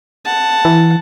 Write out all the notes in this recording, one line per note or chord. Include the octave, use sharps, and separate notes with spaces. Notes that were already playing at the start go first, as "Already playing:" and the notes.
F#5 A5
E3